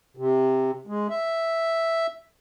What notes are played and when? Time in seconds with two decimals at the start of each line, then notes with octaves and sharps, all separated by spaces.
0.17 C3
0.87 G#3
1.10 E5